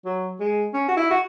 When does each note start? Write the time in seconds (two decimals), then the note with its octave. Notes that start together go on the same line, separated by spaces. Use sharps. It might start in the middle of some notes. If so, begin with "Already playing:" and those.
0.05 F#3
0.40 G#3
0.74 C#4
0.88 F#4
0.97 E4
1.10 F#4